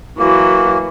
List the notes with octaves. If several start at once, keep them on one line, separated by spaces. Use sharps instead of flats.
E3 F#3 A#3